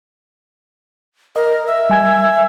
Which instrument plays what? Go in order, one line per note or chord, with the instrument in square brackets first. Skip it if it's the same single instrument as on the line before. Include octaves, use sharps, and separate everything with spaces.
[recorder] A#4 [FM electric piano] D#5
[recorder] E5
[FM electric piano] G3 G#5 G#6